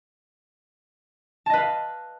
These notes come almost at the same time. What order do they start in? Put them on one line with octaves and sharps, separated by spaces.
A5 D#5 B4 F5